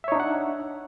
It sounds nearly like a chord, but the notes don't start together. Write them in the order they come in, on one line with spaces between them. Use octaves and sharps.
E5 C#5 D#4 D4 F#5